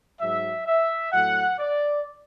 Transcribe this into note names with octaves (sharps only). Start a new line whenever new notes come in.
G#2 F#3 E5
E5
A2 F#3 F#5
D5